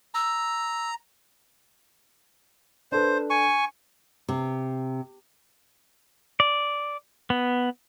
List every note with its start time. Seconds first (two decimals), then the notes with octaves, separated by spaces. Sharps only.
0.14 A#5 E6
2.92 D4 A4 B4 C5
3.30 G#5 C#6
4.29 C3
6.40 D5
7.30 B3